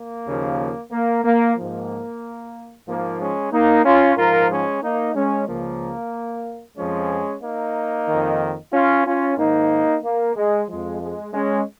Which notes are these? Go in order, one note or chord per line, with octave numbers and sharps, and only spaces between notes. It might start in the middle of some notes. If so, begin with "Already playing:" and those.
Already playing: A#3
D#2 C#3 F3
A#3
A#3
G#2 F3 A#3
G#2 F3 A#3
G#3 C#4
A#3 D#4
C#4 F4
G#2 F3 F4 A#4
G#3 C#4
A#3 D#4
G#3 C#4
C#2 C#3 F3 A#3
F2 F3 G#3 C#4
A#3 D#4
F2 D#3
C#4 F4
C#4 F4
G#2 D#3 A#3 D#4
A#3
G#3
F2 F3 G#3
G#3
G#3 C#4